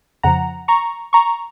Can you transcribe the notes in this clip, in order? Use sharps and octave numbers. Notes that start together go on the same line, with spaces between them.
F2 C#3 F3 F#5 A#5
A#5 C#6
A#5 C#6